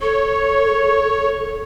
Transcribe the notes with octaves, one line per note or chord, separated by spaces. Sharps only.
A4 C#5